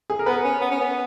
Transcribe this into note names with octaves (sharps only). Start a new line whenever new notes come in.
G#4
A#4
B3 B4
C#4
B3
C#4
B3